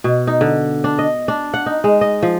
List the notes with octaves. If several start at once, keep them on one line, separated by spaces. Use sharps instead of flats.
B2
D#4
D3
D4
D#5
D4
F#5
D#4
G#3
D#5
F3